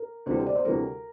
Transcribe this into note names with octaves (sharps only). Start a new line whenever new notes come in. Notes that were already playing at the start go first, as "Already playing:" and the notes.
Already playing: A#4
D2 C3 E3 G3 C5
C5
D5
C5
D2 C3 E3 G3 A#4